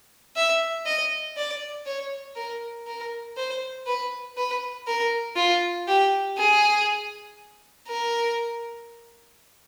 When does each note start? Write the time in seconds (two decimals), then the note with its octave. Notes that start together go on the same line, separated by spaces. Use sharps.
0.36 E5
0.86 D#5
1.36 D5
1.86 C#5
2.36 A#4
2.87 A#4
3.37 C5
3.87 B4
4.37 B4
4.87 A#4
5.37 F4
5.88 G4
6.38 G#4
7.88 A#4